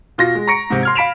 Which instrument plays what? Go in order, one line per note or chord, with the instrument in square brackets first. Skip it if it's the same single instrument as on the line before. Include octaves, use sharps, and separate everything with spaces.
[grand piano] B2 F4 F#4 A#6
G#3
A#5 C#6 A#6 C#7 D7
G#2 C3
C6 F6 G#6
F5 B5 B6 D7 E7 F7